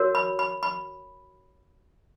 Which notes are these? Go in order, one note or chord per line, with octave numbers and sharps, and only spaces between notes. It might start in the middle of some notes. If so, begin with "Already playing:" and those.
Already playing: F#4 A#4 C#5
B5
B5
B5